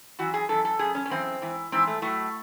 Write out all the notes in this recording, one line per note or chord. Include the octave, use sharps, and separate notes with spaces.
F#2 E3 F#4
G#4
F#2 E3 A4
A4
F#2 C#3 G#4
C#4
C#4
F#2 C#3 E3 C4
G#2 E3
G#2 E3 C4
A3
A2 F#3 A3